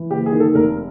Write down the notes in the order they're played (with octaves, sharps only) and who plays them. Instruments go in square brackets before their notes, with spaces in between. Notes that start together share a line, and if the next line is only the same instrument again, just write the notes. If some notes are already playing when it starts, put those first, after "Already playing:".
Already playing: [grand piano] E3
F#1 G4
G#4
D#3
A4
F1 A#4